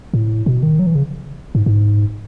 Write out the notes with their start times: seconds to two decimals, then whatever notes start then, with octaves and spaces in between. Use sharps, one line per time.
0.14 A2
0.46 B2
0.63 D#3
0.79 F#3
0.87 E3
0.95 C#3
1.55 G#2
1.66 G#2